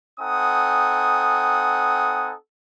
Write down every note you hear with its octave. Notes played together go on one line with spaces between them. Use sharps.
C4 D#4 A4 F#5 G#5 D#6